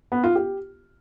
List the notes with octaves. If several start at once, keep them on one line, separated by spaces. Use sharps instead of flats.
B3
F4
G4